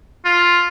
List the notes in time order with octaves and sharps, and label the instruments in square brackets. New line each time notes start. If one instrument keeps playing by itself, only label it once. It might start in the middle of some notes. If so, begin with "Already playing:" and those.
[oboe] F4